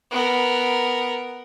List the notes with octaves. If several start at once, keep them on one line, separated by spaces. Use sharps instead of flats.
B3 A#4